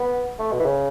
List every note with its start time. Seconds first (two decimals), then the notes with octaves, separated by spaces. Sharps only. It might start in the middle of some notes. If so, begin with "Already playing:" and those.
Already playing: B3
0.39 A3
0.52 B2
0.60 E3
0.65 C#3